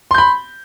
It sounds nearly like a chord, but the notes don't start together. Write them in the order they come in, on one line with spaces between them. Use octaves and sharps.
C6 G6 B5